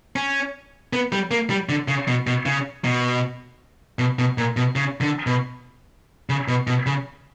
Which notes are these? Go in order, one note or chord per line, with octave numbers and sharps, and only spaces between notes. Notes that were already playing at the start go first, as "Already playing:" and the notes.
C#4
B3
G3
A#3
G3
D3
C#3
B2
B2
C#3
B2
B2
B2
A#2
B2
C#3
D3
B2
C#3
B2
B2
C#3